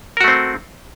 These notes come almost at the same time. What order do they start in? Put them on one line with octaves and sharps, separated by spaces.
A#4 F#4 A3 C4